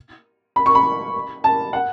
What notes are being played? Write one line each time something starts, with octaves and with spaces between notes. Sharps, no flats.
B5
C#6
B5
A5
F#5